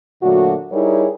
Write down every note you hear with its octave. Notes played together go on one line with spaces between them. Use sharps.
A#2 D3 F#3 A3 F#4
G3 D#4 E4 G#4 A#4 C#5